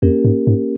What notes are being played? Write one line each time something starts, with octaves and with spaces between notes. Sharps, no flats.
F2 A#3 C#4 G4 A#4
G#2
G#2